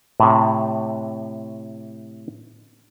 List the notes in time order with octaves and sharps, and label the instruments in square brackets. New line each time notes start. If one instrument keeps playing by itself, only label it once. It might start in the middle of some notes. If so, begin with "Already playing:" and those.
[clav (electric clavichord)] A2 C3